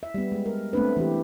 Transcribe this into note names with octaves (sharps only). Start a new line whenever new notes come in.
E5
G3 B3
G#3
A#4
A3 B3 C4 D4 B4
E3 G4